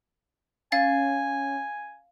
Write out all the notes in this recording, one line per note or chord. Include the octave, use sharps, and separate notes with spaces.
C#4 F5 G#5 A6